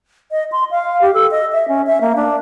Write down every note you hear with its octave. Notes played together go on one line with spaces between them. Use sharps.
D#5
C6
F5
G4
A4
D#5
E5
C#4
E5
A#3
D4